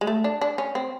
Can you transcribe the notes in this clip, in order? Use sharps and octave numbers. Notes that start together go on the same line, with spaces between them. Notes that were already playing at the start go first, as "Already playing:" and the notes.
G#3
A3
D4
D4
C#4
C4